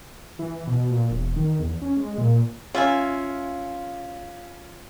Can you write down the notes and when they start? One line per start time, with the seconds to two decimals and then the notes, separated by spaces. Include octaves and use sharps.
0.39 E3
0.67 B2
0.91 A#2
1.11 E1
1.36 D#3
1.60 E2
1.82 C#4
1.97 G#3
2.18 A#2
2.75 C#4 F4 E5 G#5